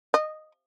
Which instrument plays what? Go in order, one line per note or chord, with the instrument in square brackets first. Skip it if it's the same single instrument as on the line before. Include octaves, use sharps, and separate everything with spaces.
[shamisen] D#5